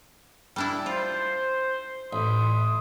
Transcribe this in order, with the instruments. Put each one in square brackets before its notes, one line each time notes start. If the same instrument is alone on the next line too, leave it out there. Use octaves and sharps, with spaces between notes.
[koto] G3 D4 E4
[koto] F4 [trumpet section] C5
[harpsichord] A1 [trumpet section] E4 C6 D#6